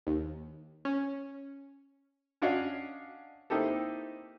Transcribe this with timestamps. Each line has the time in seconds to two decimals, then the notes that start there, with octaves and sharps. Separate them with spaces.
0.07 D#2
0.85 C#4
2.42 C#4 D4 C#5 D#5 F5 F#5
3.50 A#3 C4 D#4 E4 G4 A4